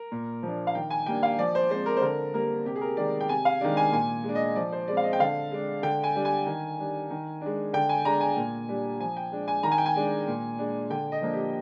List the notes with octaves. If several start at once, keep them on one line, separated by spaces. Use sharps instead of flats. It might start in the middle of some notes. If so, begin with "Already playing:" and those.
Already playing: A#4
A#2
F3 A#3 D4
F5
D#3 G5
G#5
G3 A#3 D4 G5
F5
F3 D5
C5
G#3 C4 C5
A#4
C5
D3 A#4
G3 A#3 A#4
C3 G4
G#4
A#4
D#3 G#3 D5
G5
C3 G#5
F5
D#3 G#3 D4
G#5
A#2 G#5
G#3
D4
D#5
F3 D5
C5
G#3 C4 D5
F5
D#5
G5
D3 F5
G#3 D4
D3 G5
G#5
G3 D4
G#5
D#3
G3 D4
D#3
G#3 D4
D3 G5
G#5
G#3 D4 A#5
G#5
A#2
G3 D4
F3 G#5
G5
G#3 D4
G#5
D#3 A#5
G#5
G5
G#5
G#3 D4
A#2
G#3 D4
D3 G5
D#5
F3 A#3 D4
G4